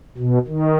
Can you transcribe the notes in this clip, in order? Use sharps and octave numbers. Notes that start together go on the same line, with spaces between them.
B2
D#3